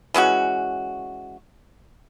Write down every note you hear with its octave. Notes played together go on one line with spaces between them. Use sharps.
E3 G#3 C#4 F#4